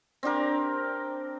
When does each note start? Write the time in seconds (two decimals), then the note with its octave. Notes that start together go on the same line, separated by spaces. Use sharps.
0.23 C4 D4 G4 A#4